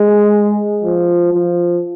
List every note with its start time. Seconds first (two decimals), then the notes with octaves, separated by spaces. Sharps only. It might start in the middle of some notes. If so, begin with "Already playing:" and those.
Already playing: G#3
0.83 F3
1.33 F3